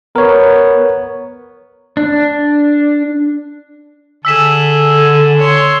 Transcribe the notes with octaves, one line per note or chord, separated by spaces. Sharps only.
B3 A#4 C#5
D4
D3 D4 G#4 E6 B6 E7
C#5 C6